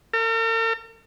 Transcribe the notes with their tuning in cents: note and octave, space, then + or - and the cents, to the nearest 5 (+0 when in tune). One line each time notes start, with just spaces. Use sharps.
A#4 -45